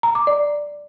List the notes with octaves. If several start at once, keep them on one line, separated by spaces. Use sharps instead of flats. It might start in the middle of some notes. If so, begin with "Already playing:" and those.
A#5
D6
D5